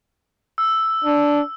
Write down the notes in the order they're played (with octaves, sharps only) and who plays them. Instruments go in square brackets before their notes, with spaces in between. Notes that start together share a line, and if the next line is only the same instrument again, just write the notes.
[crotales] E6
[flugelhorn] D4